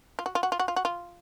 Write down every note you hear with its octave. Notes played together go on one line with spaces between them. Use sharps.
F4
F#4
F4
F#4
F4
F#4
F4
F#4
F4